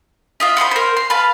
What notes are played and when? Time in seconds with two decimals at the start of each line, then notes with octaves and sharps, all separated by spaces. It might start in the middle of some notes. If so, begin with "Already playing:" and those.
0.40 F4 D#5 E5
0.57 F#4 C5 D#5 B5
0.71 A#4 C5
0.97 C6
1.10 B4 F5 A5